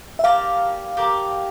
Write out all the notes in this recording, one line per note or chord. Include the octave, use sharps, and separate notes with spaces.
E5
G4 A#4 D5 F5 A5
G4 A#4 D5 A5